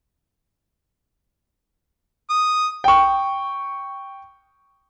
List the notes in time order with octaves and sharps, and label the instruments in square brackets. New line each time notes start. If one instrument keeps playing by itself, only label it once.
[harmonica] D#6
[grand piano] G5 C#6